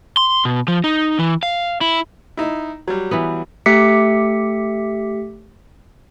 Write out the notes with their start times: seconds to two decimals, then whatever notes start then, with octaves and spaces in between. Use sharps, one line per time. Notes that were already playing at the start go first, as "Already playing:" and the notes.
0.17 C6
0.45 B2
0.68 F3
0.84 D#4
1.19 E3
1.43 F5
1.81 E4
2.37 D#4 E4
2.88 F#3 G3
3.11 E3 B3
3.66 A3 G4 E5 D6 B6 C#7